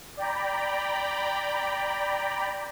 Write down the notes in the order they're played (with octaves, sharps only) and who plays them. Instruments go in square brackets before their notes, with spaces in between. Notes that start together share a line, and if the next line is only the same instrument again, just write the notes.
[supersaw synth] D5 G5 A#5 B5